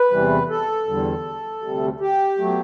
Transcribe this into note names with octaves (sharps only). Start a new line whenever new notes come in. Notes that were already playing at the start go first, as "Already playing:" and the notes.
Already playing: B4
E2 C3 E3 G3
A4
E2 D3 G3
D2 C3 G3
G4
B2 F#3 A3